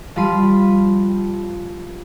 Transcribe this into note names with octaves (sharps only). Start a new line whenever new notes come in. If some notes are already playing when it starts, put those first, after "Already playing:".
F3 G3 F4 B5 C6 D#7